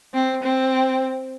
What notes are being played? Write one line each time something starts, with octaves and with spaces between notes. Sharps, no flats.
C4
C4